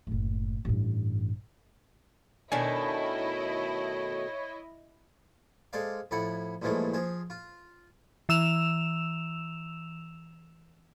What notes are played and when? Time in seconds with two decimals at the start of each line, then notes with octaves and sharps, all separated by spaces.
0.07 F#1 A2
0.65 A1 G2
2.52 B2 D#3 A3 D4 E4 C#5 D#5 G#5
5.73 G#3 A4 C5 D5 F5
6.11 F2 A2 E4 F#5
6.62 C2 A#2 E3 F3 G#3 A3
6.93 F3 G#4 C5
7.30 F4
8.29 E3 E6 E7 F7